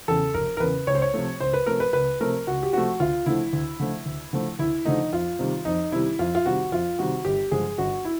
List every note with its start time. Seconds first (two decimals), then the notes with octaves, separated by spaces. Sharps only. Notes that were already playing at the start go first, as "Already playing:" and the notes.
0.08 E2 C#3 A4
0.34 F1 A#4
0.57 A#4
0.60 E2 C#3 B4
0.87 C#2 C#5
0.95 C5
1.02 C#5
1.13 C3 F3 A3
1.40 C#2 C5
1.54 B4
1.66 C3 F3 A3 A#4
1.80 B4
1.93 C#2 B4
2.20 C3 F3 A3 A#4
2.47 C#2 F#4
2.63 G4
2.73 C3 F3 A3 F#4
3.00 D2 F4
3.26 D3 F3 A3 E4
3.53 D2
3.80 D3 F3 A3
4.06 D2
4.33 D3 F3 A3
4.59 D2 E4
4.86 D3 F3 A3 D#4
5.13 F2 F4
5.39 C3 D#3 G3
5.65 F2 D#4
5.92 C3 D#3 G3 E4
6.19 F2 F4
6.35 F4
6.46 C3 D#3 G3 F#4
6.72 F2 F4
6.99 C3 D#3 G3 F#4
7.25 G1 G4
7.51 G2 D3 F3 G#3 G#4
7.78 G1 F#4
8.05 E4